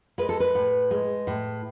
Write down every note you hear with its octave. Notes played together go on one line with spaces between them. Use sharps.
G#3 B4
A4
B4
A2
G#3
A2